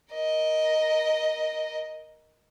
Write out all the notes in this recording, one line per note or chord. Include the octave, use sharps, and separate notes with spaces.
A#4 D#5